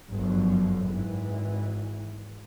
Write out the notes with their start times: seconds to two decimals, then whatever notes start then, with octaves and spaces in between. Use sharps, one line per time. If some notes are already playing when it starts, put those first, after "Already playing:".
0.11 G1 F#2 F3 F#3
0.84 G#1 E3